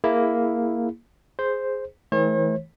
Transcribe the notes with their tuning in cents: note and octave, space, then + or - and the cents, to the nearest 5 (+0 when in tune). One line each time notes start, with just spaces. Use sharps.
A#3 +0 E4 +0 G#4 +0
G#4 +0 C5 +0
E3 -40 A3 -30 C#5 -45